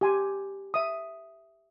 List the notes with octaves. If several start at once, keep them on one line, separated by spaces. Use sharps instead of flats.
G4 G#5 C6
E5 D#6